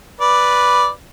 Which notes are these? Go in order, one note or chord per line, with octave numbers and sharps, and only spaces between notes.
B4 D5